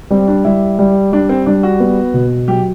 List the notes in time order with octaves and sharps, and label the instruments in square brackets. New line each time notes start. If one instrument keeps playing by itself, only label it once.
[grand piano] G3 [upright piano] C4
[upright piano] D4
[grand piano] G3 [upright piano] E4
[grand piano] G3
[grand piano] G3 [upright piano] D4
[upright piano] C4
[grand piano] G3 [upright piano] D4
[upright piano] F#4
[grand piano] B3
B2
[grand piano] F#3 [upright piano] G4